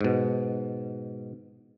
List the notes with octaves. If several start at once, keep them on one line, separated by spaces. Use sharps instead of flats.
G#2 B2